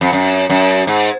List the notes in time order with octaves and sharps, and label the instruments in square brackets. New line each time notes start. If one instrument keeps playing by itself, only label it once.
[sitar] F2
F#2
F#2
G#2